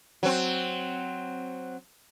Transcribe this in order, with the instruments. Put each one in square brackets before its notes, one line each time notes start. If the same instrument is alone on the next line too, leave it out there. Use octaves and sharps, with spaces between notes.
[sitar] F#3 C4